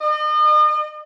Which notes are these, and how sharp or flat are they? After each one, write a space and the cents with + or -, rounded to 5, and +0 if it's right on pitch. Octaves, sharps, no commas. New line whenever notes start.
D#5 -40